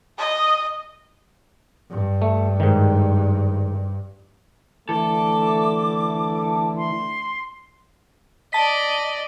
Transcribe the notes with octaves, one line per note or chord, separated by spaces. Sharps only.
D#5
G2
A3
G#2 D#3
D3 E3 A3 A4 D6
C6
D5 D#5 A5 B6